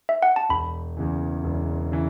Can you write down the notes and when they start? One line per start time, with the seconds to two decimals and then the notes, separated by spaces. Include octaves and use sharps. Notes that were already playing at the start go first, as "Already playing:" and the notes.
0.09 E5
0.22 F#5
0.36 A5
0.49 E1 B5
0.97 E2 C#3 E3
1.44 E1
1.92 C#3 E3